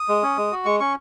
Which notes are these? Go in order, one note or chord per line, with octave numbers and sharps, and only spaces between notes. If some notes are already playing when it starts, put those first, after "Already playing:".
Already playing: D#6
G#3
C#4
G#3
F#4
G#3 C#6
C#4 C#6